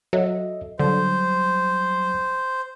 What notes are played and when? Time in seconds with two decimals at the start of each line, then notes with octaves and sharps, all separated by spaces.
0.13 F#3 A4 D#5 E5
0.79 D3 F#3 G3 C5